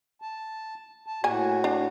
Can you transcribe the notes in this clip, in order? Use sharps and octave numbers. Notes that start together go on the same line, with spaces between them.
A5
A5
A2 A#3 F#4 G#5
D4